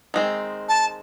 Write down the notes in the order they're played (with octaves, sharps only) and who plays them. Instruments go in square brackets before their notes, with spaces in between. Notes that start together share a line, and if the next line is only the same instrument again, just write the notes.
[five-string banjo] D#3 G#3 C4
[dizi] A5